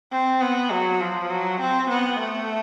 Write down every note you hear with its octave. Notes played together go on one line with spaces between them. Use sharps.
C4
B3
F#3
F3
F#3
C4
B3
A3